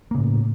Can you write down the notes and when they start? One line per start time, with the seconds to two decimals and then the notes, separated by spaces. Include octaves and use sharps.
0.11 A#3
0.15 C#3
0.18 A2